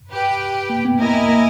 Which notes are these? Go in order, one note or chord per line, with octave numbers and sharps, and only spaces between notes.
G4 B4 G5
A#3
B3
A#3 E4 A#4 D#5 G#5
A#3
A#3